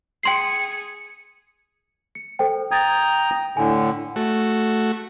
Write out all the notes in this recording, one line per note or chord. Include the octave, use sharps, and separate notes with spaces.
G#4 G5 C6 C7 C#7
C#7
A4 C5 G5
G5 A#5 D#6 G#6 A6
A2 D3 G#5
A3 F#4